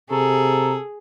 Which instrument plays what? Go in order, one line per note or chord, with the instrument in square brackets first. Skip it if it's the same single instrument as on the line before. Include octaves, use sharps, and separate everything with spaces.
[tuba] C3 [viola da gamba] G#4 [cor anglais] A4 [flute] A#5